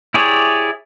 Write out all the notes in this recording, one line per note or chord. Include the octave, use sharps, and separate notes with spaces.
E4 G4 G#4 C#5 D5